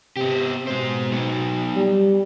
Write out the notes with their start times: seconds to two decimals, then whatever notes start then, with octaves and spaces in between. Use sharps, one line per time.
0.17 C3 B3 G4
0.67 B2 G#3 C5
1.12 B3 D#4
1.76 G3